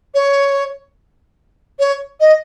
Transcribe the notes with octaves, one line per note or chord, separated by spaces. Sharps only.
C#5
C#5
D#5